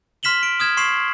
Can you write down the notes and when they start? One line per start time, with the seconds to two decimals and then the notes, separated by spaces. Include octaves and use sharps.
0.23 C6 F6 B6 E7 F#7 G7
0.43 D7
0.60 D#6 F6 G#6 E7
0.77 C6 C#6 C7 E7 F#7